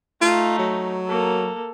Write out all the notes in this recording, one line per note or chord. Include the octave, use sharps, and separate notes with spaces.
A3 D#4 F4
F#3
A#3 A4